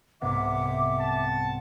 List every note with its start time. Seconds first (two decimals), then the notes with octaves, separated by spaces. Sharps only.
0.21 C2 G#2 B3 E5 F#5 D6
1.00 A5